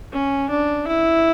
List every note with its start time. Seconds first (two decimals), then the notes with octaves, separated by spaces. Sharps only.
0.12 C#4
0.50 D4
0.88 E4